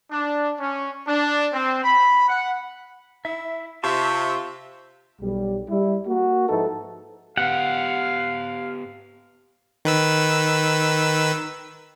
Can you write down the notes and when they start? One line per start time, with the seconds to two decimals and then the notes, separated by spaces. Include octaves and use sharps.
0.10 D4
0.59 C#4
1.06 D4
1.53 C4
1.84 B5
2.28 F#5
3.25 E4 E5
3.84 C3 F4 E5 A5 C#6
5.21 B1 G3
5.69 G3 E4
6.07 A#3 F#4
6.49 G#2 F3 D#4 E4 A4 B4
7.37 B3 G4 F5 F#5
9.85 D#3 B4 E6